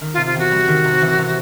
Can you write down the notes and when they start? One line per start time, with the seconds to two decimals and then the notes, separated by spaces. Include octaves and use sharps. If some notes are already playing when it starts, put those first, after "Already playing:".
0.01 D#3
0.14 F4
0.17 C3
0.26 F4
0.34 E2 F#4
0.51 G3
0.68 D#3
0.84 C3
1.01 E3
1.18 C3